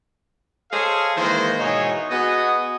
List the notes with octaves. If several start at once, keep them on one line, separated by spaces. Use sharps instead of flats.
G#4 A4 C5 C#5 D#5 F5
D#3 E3 G#3 A#3 C5
G#2 B2 E3 D#4 G#4 C#5
B3 F#4 G#4 D#5